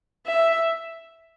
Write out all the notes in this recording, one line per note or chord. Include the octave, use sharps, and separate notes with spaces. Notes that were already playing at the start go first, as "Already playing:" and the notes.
E5